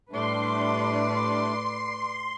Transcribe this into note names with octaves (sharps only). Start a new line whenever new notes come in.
A2 G3 A3 D4 B4 D5 C6